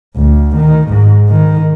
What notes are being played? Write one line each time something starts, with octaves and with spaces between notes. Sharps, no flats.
D2
D#3
G#2
D#3